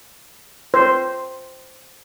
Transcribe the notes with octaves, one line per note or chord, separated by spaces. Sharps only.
C5